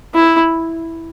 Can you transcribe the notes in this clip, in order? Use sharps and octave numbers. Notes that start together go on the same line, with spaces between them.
E4